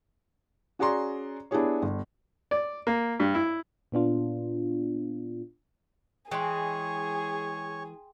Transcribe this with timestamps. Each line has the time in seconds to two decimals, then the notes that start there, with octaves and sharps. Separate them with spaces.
0.79 C#4 F#4 G#4 D5 A#5 C6
1.51 B3 D4 E4 G4 G#4 C#5
1.82 G1
2.51 D5
2.87 A#3
3.20 G2
3.34 E4
3.92 A#2 B3 D4 F4
6.31 E3 G#3 G#4 C#5 G5 C6